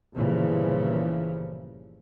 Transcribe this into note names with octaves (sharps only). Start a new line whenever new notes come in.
G1 A#2 C#3 E3 F3